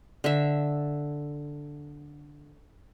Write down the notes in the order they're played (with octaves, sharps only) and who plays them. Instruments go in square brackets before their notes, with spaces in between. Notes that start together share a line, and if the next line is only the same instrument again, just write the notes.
[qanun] D3 E5